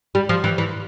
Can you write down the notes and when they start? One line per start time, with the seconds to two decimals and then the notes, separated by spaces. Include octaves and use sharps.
0.15 G3
0.29 F3
0.44 E3
0.58 E3